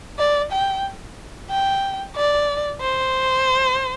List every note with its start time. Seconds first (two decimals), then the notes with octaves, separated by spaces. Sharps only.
0.19 D5
0.52 G5
1.50 G5
2.15 D5
2.81 C5